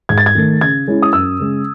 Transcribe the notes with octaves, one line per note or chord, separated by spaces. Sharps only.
G#2 G#6
A6
G#6
D#3 A3
C#3 G#6
G#3 C#4 E4
D#6
F#2 E6
C#3 G#3